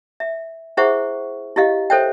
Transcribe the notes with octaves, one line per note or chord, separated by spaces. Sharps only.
E5
E4 G#4 C5 E5 F#5 C#6
E4 G4 D#5 F5
A4 C5 C#5 E5 G5